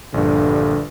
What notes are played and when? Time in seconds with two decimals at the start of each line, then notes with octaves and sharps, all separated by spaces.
0.14 A#1 G2 D3